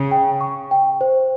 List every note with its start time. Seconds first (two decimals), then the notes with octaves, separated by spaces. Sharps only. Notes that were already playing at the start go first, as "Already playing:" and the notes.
Already playing: C#3
0.11 G5
0.41 C#6
0.71 G5
1.01 C5